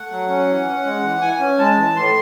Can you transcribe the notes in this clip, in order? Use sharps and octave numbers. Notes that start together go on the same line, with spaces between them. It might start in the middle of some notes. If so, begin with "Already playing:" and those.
Already playing: A3 F#5
F#3
C#4
E3
C#4
G#3
E3
E3 G#5
C#4
G#3 A5
E3
A2 C6